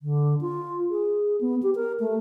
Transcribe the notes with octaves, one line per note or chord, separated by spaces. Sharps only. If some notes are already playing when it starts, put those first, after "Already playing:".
D3
F4
G#4
B3
G4
A#4
A3